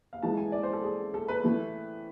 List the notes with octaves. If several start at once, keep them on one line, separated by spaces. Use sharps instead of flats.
F5
A2 E3 G#3 A5
G#5
D5
C5
A4
G#4
A4
B4
A2 E3 A3